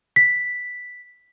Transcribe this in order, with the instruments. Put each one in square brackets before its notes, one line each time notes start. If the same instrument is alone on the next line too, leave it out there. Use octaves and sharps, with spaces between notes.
[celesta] B6